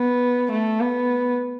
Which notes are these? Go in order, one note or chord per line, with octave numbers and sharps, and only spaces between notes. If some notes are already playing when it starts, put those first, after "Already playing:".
Already playing: B3
A3
B3